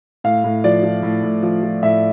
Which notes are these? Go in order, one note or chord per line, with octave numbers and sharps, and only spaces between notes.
A2 F5
A2
F3 D5
F3
A2
A2
F3
F3
A2 E5